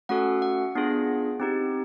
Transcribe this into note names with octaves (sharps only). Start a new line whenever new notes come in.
A3 C#4 F#4 A4 F#5
F#5
B3 D4 F4 G#4
C4 D#4 G4